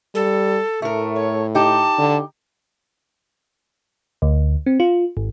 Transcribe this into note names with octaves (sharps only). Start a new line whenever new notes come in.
G3 A4
A2 A3 A#4
C#5
D#4 G4 A5
D3
D2
C4
F4
G#1